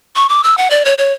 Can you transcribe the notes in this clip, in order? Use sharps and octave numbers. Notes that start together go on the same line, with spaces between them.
C#6
D6
E6
F#5
D5
C#5
C#5